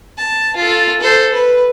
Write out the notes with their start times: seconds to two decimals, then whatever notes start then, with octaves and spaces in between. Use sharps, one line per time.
0.18 A5
0.56 F4 A4
1.01 A4 C5
1.33 B4